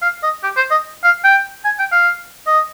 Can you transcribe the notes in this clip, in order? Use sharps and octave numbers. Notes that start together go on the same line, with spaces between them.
F5
D#5
G4
C5
D#5
F5
G5
G#5
G5
F5
D#5